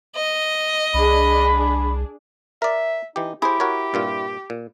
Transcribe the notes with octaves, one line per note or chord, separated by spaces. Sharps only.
D#5
C2 D4 G#4 B5
A#4 D5 E5
E3 D#4 G4
E4 G4 G#4 C5
F#4 A#4 C#5
G2 A#2 F4
A#2